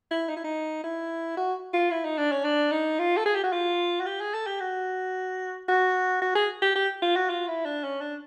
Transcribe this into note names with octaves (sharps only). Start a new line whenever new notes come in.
E4
D#4
E4
D#4
E4
F#4
F4
E4
D#4
D4
C#4
D4
D#4
F4
A4
G#4
G4
F#4
F4
F#4
G4
G#4
A4
G4
F#4
F#4
F#4
G#4
G4
G4
F4
F#4
F4
E4
D4
C#4
D4